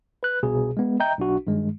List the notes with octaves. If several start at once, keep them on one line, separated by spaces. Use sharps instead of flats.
B4 F#6
C2 B2 G#4
G#3 B3
D#5 E5 G5 A#5 G6
B1 D4 F#4
G2 D#3 G#3